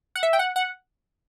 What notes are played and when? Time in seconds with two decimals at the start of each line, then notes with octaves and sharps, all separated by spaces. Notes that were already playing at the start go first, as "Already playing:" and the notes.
0.15 F#5
0.23 E5
0.33 G5
0.39 F#5
0.56 F#5